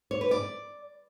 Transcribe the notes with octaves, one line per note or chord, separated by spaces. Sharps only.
C#5
B4
D5